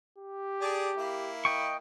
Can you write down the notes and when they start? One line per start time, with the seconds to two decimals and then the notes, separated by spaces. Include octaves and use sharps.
0.18 G4
0.61 G#4 D5 A5
0.97 A#3 E4
1.45 D#5 G5 C#6